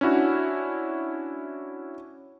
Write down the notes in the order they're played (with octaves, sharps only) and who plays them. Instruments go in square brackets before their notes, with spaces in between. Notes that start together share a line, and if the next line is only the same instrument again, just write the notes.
[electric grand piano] C#4 D4 E4 F#4